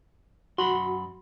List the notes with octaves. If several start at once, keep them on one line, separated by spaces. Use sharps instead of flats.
F#2 F#4 B5 C6